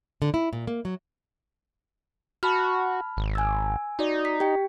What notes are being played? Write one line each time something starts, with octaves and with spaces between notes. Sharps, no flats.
D3
E4
A#2
A#3
F#3
F#4 A5 B5 F6
G#1
G#5 E6
D#4 F#4 D5
B6
G4 G5